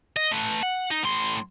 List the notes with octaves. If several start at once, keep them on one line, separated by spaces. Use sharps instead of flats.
D#5
A3 B4
F#5
D#4
A2 C6